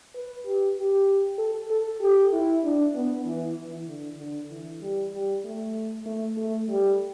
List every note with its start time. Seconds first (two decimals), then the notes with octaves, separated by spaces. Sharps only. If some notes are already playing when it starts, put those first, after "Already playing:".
0.15 B4
0.45 G4
0.77 G4
1.38 A4
1.70 A4
2.01 G4
2.33 E4
2.64 D4
2.95 B3
3.26 E3
3.57 E3
3.88 D3
4.19 D3
4.51 E3
4.81 G3
5.13 G3
5.45 A3
6.06 A3
6.37 A3
6.69 G3